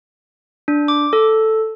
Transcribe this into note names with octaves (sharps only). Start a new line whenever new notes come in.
D4
D6
A4